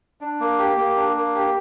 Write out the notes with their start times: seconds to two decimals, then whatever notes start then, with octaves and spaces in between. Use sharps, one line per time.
0.21 D4
0.40 A#3
0.59 G4
0.78 A#3
0.97 D4
1.16 A#3
1.35 G4